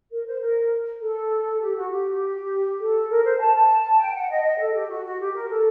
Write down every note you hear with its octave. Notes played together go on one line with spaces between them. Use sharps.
A#4
C5
A#4
A4
G4
F#4
G4
A4
A#4
C5
A5
A5
G5
F#5
D#5
D#5
A4
G4
F#4
F#4
G4
A#4
A4